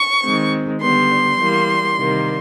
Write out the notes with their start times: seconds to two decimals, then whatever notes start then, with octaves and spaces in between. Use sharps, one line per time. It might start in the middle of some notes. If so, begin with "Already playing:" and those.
Already playing: C#6
0.23 D#3 G#3 C4
0.81 D3 G3 B3 C6
1.38 E3 G3 A#3
1.96 C3 D#3 G3 A#3